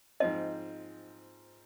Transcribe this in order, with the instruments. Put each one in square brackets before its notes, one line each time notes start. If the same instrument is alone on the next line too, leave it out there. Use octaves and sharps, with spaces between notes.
[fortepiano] G#2 F3 C4 [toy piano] D#5